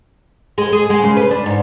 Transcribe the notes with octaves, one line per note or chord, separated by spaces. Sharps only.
G#3
G#4
G#3
C#3
B4
D4
G#2